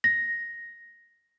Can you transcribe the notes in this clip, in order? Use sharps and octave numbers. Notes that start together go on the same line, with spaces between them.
A#6